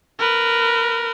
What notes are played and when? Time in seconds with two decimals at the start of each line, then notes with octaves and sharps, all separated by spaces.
0.19 A#4 B4